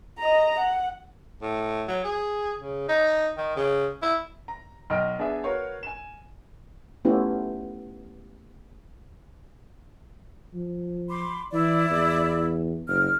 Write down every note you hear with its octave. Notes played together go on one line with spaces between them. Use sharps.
D#5 A#5
F#5
A2
F#3
G#4
C#3
D#4
D#3
C#3
E4
A#5
B1 D#5 G5 F6 D7
B3 D4 G#4 B4 E5 G#5
F#4 A#4 B4 C#5 F5
G#5 E7
A3 B3 C#4 E4 F4 G4
F3
B5 C6 D6
E3 E4 D5 E5
E2
F#1 F6